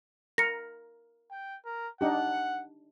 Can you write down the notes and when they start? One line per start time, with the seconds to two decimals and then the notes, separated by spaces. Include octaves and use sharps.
0.38 A#4 A#6 C#7
1.31 G5
1.65 A#4
2.01 D4 D#4 G4 F#5